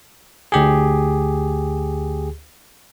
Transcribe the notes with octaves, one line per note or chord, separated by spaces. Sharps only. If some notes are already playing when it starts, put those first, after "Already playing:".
D2 G4 G#4